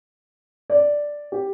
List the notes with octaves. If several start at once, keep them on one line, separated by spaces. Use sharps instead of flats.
D5
G4